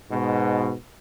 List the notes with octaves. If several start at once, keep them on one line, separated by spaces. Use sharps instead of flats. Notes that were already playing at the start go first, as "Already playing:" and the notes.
G#2 B2